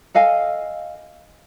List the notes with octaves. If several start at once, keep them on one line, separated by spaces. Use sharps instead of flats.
A4 D#5 F5 G#5